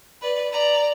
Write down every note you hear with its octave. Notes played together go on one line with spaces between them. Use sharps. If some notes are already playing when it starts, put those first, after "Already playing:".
B4 D5
D5 A#5